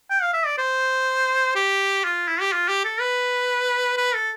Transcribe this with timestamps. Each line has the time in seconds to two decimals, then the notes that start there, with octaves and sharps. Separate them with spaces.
0.10 G5
0.22 F5
0.34 E5
0.46 D5
0.58 C5
1.56 G4
2.04 F4
2.28 E4
2.41 G4
2.52 F4
2.69 G4
2.85 A4
3.00 B4
3.97 B4
4.14 A4